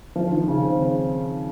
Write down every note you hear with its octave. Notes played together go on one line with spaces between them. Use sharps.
F3
D#3
C#3
C4